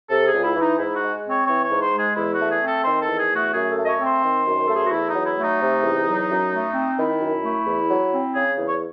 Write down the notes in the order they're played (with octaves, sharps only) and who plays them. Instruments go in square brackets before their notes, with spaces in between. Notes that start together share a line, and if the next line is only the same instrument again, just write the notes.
[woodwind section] C3 A4
G#4
C#2
E4
E3
D#4
G#2 E4
F#4
G#3
C4
C#5
E3 C#5
C#5
G#2
C5
G#3
G#4
E2 E4
F#4
A3
G#4
C4
A4
D#3 C5
A4
E2
G#4
A3
F#4
F#2 G#4
A4
A3
D#5
C#5
C4
C5
D#3
F#2
A3 A4
G#4
F#4
E2 E4
D#4
F#3
E4
A3
D#4
C3
E2
F#3
F#2
A3
C4
D#3 E4
F#2
A3
E2
F#3
C4
C#3 G#4
E2
C#5